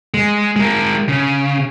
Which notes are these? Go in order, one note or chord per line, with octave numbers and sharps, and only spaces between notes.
G#3
G#3 A#4
C#3